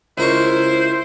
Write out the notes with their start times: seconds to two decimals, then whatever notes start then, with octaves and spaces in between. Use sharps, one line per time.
0.18 C#2 E4 A#4 C5 C#6